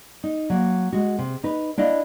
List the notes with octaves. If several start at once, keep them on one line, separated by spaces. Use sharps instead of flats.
D#4
F#3 A#3
G#3 F#4
C3
D#4 B4
D4 E4 D#5 F5